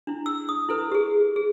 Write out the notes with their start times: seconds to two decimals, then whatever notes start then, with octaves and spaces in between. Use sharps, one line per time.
0.07 D4 E4
0.26 E6
0.49 D#6
0.69 E4 A4 B4
0.91 G4 G#4
1.36 G#4